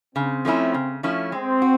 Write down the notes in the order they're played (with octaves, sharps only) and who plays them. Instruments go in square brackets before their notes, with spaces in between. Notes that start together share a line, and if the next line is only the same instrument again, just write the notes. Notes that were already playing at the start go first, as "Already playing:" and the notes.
[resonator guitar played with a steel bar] C#3 [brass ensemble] C4
[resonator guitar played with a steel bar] F3 A3 C#4 E4
C#3
F3 A3 C#4 E4
[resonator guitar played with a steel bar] G#3 [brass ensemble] C4
[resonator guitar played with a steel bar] F#4